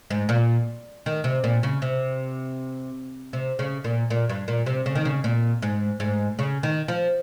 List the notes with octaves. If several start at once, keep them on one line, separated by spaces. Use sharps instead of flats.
G#2
A#2
D#3
C3
A#2
C#3
C3
C3
C#3
A#2
A#2
G2
A#2
C3
C#3
D#3
C#3
A#2
G#2
G#2
C#3
D#3
F3